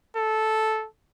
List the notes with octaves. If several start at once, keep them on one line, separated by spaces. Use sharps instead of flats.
A4